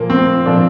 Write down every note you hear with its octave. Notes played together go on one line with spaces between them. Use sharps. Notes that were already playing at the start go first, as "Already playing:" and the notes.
Already playing: A#2 F3 A#3
C4
A#2 F3 D4